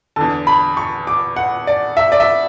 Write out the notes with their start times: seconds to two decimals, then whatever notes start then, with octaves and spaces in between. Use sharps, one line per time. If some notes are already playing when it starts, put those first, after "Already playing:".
0.16 E2 D3 A5
0.47 B5
0.77 C#6
1.07 D6
1.36 F#5
1.67 D5
1.97 E5
2.12 D5
2.20 E5